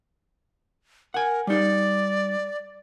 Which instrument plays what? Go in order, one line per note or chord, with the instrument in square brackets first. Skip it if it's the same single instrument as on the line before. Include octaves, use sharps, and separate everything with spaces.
[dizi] A#4 [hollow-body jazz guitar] F#5 G#5
[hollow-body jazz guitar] G3 D#4 [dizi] D5